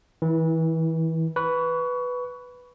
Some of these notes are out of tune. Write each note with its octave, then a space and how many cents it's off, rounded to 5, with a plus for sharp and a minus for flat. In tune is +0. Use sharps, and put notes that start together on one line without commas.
E3 -30 E4 +0
B4 +0 C#6 +25